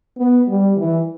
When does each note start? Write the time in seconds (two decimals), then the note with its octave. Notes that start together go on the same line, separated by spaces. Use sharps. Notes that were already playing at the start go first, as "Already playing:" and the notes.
0.18 B3
0.48 G3
0.77 E3